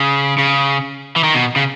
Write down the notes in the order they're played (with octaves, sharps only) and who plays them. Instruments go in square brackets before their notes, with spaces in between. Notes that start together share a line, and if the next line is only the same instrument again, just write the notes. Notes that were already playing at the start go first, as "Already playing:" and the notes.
Already playing: [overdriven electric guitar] C#3
C#3
E3
D#3
B2
C#3